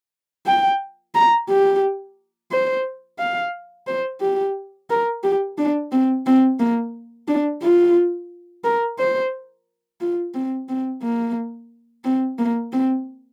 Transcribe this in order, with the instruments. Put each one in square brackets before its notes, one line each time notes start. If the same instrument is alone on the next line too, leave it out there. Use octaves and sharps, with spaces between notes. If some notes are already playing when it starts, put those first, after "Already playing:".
[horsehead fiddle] G5
A#5
G4
C5
F5
C5
G4
A#4
G4
D4
C4
C4
A#3
D4
F4
A#4
C5
F4
C4
C4
A#3
C4
A#3
C4